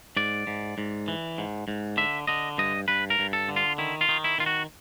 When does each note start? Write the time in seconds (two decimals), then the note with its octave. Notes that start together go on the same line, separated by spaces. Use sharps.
0.17 G#2 D5
0.47 G#2
0.78 G#2
1.08 E3
1.38 G#2
1.68 G#2
1.97 D3 E5
2.27 D3 D#5
2.58 G2 D#5
2.88 G2 B4
3.10 A#4
3.19 G2
3.33 A4
3.49 D3
3.56 F4
3.78 D#3 E4
4.01 F4
4.09 D#3
4.24 E4
4.38 D#3 F4
4.46 F#4